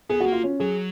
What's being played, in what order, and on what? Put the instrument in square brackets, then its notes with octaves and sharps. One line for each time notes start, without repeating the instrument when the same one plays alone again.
[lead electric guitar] B3 [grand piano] G#4
[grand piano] F#4
[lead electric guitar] A#3
[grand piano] F4
C#4
[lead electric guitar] F#3 [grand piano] G#4